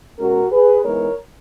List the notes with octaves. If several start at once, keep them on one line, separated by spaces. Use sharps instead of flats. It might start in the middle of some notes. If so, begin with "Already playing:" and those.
B2 G#3 C#4 F#4 A#4
G#4 B4
E3 G#3 B3 D#4 A#4 C#5